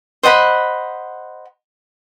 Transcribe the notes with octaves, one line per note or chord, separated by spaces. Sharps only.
C5 D#5 F#5 B5